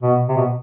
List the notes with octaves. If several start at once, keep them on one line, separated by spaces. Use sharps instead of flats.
B2
C3
B2